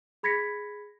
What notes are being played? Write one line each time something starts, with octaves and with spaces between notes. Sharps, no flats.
G#4 B5 G#6 A#6 B6 C#7